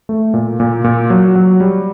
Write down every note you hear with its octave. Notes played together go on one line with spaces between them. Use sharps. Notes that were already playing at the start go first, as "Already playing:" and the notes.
A3
A#2
A#2
A#2
F#3
F#3
G3